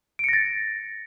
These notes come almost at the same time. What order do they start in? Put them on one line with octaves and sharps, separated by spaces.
D7 C#7 A#6 A6